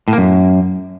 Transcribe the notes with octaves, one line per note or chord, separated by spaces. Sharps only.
A2
A#3
F#2